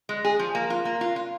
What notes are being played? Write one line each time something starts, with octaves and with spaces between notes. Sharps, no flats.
G#3
G#4
F3
A#3
F4
A#3
F4
F4